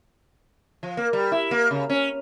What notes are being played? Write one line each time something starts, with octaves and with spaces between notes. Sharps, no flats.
F3
A#3
G3
E4
A#3
C#3
C#4